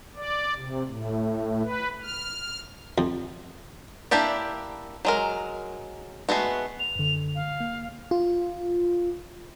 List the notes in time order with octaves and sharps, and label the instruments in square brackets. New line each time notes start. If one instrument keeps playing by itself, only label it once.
[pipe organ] D5
C3
A2
B4
F6
[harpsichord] F2
[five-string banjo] A#3 D4 E4 G4 D5
F#3 G#3 A#4
G#3 A3 B3 F#4
[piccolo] F7
[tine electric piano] F#2 D3
[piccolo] F5
[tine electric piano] A#3
[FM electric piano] F4